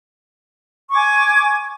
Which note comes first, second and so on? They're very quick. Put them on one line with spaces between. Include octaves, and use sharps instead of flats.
C#6 D6 G#5 G#6